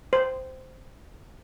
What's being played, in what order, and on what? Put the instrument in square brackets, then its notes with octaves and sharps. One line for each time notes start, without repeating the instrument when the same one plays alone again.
[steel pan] C5